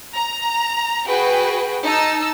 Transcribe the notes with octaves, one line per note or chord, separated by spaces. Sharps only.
A#5
F#4 G#4 B4 G5
D#4 A5 E6